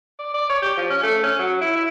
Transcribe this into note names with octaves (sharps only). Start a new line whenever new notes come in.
D5
D5
C#5
G4
F3
C#4
A3
C#4
F#3
E4
E4